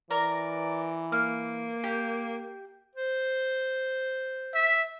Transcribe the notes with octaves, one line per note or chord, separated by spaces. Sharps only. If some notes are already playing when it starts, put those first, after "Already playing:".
E3 A#4 D5 A#5
A#3 F6
G4
C5
E5